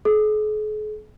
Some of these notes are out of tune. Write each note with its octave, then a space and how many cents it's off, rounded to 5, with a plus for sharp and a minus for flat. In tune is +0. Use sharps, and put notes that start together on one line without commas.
G#4 +45